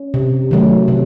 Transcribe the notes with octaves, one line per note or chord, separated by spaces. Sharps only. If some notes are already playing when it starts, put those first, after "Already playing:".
Already playing: C#4
C3
D#3 F#3 A3
C3